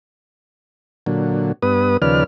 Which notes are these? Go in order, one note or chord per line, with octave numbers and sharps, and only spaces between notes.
A#2 D3 F#3
G2 B3 B4 D#6
D#2 C#3 F3 B4 D5 F6